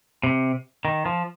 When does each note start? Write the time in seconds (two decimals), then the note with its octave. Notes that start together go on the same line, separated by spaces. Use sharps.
0.24 C3
0.85 D#3
1.06 F3